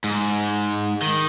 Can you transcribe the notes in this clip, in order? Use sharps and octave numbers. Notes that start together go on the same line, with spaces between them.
G#2
D#3